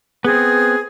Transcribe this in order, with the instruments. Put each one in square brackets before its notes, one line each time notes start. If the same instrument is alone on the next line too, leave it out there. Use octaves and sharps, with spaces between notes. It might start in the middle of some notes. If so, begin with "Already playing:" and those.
[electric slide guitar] B3 C4 [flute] G#4